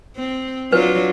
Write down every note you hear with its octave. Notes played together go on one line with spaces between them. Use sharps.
C4
F#3 D4 F4 B4